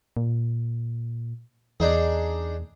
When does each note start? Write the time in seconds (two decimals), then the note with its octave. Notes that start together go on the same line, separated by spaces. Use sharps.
0.17 A#2
1.80 E2 D4 D#4 G#4